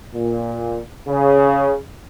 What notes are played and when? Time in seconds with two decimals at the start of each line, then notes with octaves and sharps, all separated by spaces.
0.14 A#2
1.08 C#3